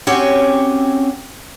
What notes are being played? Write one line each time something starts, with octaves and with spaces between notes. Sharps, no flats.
C4 C#4 F#4 G4 C#5 G#5